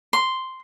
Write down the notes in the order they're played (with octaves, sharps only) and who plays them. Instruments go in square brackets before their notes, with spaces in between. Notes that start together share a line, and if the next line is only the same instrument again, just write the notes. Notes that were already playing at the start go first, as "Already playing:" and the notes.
[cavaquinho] C6